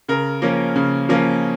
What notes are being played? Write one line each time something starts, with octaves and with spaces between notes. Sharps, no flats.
C#3 A#4
F3 A#3 C#4
C#3
F3 A#3 C#4